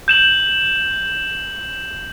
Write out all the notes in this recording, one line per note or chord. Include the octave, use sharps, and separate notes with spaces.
G6 E7 F#7